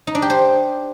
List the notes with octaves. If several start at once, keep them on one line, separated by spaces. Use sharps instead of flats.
D#4
D4
G4
C5